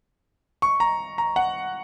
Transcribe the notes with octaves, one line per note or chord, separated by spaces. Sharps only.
C#6
A#5
A#5
F#5